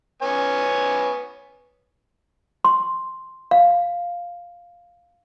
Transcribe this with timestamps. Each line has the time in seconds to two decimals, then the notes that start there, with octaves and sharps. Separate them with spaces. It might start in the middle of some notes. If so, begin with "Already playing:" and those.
0.22 B3 C#5 G#5
2.65 C6
3.51 F5